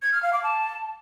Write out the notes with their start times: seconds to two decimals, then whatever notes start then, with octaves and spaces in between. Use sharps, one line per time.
0.02 G#6
0.12 F6
0.23 F5
0.33 D6
0.43 A5